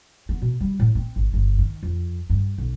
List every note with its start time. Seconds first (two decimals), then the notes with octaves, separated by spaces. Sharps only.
0.29 B3
0.42 B2
0.60 G3
0.80 A2
0.95 C4
1.16 G#1
1.34 G1
1.58 D#3
1.83 F2
2.30 G2
2.58 B1